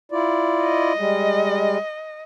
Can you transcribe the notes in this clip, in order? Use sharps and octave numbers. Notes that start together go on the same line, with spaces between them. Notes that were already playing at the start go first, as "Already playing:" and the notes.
E4 F4 D5
D#5
G3 G#3